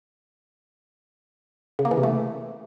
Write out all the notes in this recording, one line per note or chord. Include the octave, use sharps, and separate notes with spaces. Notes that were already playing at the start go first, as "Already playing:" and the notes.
C#3
A#3
E3
C3
A3